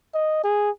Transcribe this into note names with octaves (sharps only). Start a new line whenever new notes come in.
D#5
G#4